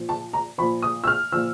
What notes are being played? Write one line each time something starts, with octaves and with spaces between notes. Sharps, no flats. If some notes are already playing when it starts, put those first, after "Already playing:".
Already playing: A#2 F3
A5
A#5
A#2 F3 B5
D#6
E6
F6
A#2 F3 E6